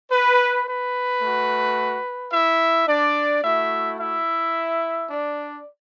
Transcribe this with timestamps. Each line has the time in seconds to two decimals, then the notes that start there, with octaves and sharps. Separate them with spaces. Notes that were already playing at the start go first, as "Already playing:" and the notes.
0.11 B4
0.67 B4
1.22 A3 F#4
2.32 E4 E5
2.87 D4 D5
3.43 A3 E4 F#4 E5
3.98 E4 E5
5.08 D4 D5